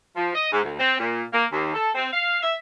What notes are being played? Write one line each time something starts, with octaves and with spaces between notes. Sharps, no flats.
F3
D#5
G#2
D2
C4
A#2
A#3
D#2
A4
C4
F5
E5